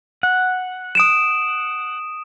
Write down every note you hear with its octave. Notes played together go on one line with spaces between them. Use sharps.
F#5
D#6 D7 E7